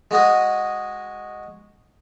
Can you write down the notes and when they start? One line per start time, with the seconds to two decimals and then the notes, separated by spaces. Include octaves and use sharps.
0.11 G#3 F#4 G#4 D#5